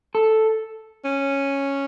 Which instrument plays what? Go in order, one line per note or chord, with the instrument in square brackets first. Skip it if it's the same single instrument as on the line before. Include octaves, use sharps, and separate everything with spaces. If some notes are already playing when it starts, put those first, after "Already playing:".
[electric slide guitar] A4
[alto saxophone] C#4